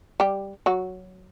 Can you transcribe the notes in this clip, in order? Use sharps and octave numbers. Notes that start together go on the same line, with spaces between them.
G3 G4
F#3 F#4